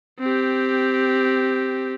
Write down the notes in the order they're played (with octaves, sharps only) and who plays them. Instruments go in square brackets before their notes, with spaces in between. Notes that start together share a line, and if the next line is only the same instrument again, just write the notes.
[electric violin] C4 G4